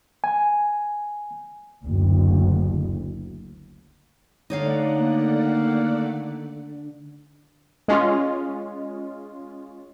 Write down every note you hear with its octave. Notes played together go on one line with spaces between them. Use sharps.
G#5
F#1 D2
D3 A3 D#4 C#5 D5 F5 F#5
A#3
G#3 C#4 F4